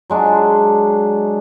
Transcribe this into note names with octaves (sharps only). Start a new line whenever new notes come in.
F#3 G#3 D4